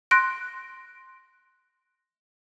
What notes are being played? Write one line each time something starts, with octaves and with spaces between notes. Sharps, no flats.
C6 F#6 A#6 D7